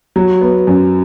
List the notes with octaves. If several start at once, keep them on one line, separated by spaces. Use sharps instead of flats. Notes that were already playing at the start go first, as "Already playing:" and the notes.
F#3
B3
F#2